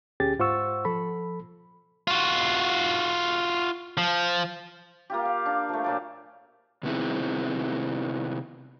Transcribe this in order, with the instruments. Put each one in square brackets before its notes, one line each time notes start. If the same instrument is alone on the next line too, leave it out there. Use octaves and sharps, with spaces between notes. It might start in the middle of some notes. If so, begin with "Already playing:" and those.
[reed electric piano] D2 C#4 G4 G#4 A6
G#2 F4 C5 F#5 C#6 E6
F3 A4 B5
[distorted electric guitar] F4 F#4
F3
[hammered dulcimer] A#3 F4 G4
F5
D4
F3 A3
A#2 F#3 D5
[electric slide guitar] C3 D#3 B3 C4 E4 G#4